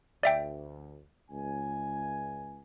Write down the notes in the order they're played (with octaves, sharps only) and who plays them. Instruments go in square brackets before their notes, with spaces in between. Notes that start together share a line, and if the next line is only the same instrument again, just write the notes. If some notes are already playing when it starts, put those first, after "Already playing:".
[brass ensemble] D2 [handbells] D5 E5 G5
[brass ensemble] C#2 G#5